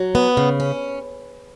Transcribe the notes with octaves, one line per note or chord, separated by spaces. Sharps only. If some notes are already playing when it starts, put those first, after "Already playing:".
Already playing: F#3
B3
C#3
C#4